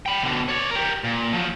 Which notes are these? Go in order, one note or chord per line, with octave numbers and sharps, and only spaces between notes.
G5 B5
B2 D3
C#5 D5
G4 A#4
A#2
F3 F#3